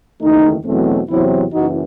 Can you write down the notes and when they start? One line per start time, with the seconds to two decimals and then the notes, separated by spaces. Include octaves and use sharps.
0.21 F#1 E2 D#3 A3 D#4
0.65 E2 B2 F#3 A3 C4
1.09 E2 C3 F#3 C4 E4
1.52 F#1 F#2 E3 D#4 F#4